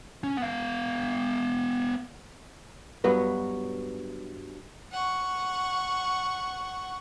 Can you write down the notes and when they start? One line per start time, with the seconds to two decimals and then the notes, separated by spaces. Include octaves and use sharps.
0.23 C#4
0.38 B3 F5
3.04 G2 F#3 B3 F#4
4.92 F#5 C#6